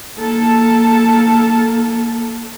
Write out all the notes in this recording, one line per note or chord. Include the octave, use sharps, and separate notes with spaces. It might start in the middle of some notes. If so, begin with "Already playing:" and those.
A#3 A4